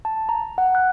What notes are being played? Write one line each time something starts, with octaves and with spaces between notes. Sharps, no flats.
A5
A#5
F#5
F#6